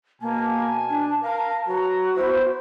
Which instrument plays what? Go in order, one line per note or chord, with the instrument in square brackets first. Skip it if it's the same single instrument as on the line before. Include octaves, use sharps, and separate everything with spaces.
[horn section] B2 G#5 [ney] A#3 [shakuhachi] A5
[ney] D4
[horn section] A#4 [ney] F5
[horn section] F#3 B4 A#5 [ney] F#4
[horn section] B3 E4 [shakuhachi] C5